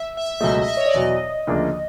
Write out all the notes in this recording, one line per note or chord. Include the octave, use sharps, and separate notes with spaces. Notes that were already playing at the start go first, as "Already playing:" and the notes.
Already playing: E5
E5
E5
C#2 B2 F#3 A3 D#5
D#5
E5
C#5
D5
E2 B2 F#3 D#5
D2 C#3 F3 A#3 D4